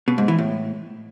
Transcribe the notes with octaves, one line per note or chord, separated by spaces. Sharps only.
B2
G#2
E3
A2